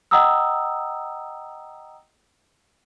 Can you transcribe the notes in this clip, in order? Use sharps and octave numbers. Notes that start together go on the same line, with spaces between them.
D#5 F#5 G5 A#5 D#6 E6